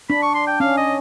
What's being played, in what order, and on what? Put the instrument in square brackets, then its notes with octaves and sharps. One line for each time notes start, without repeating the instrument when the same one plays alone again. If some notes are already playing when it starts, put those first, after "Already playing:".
[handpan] D4 [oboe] B5
[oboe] C#6
C6
G5
[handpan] C#4 [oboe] F5
[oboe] D#5